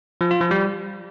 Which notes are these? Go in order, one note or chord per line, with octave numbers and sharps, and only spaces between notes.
F3
F4
F3
G3